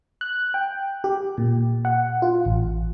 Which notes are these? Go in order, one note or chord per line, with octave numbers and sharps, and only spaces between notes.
F#6
G5
G4
A#2
F#5
F4
A1